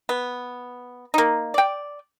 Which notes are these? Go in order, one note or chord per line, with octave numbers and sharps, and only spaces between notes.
B3
A#3 D#4
D5 G5